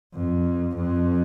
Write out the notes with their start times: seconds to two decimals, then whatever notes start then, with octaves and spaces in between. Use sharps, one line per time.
0.15 F2
0.76 F2